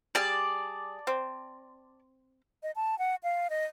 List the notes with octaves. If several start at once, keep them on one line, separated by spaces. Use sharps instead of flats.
G3 G#4 D5 A5
C4
D#5
A5
F#5
F5
D#5